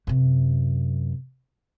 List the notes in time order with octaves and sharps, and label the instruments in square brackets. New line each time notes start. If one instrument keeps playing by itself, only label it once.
[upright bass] F#2 C3